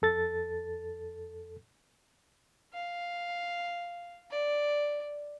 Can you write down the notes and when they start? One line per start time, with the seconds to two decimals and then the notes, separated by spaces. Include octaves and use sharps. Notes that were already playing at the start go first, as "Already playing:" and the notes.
0.02 F2 A4 A6
2.73 F5
4.31 D5